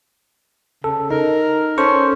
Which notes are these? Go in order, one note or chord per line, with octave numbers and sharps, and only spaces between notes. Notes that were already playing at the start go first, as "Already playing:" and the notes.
C#3 A4
D#4 A#4
C#4 A4 C5 C#6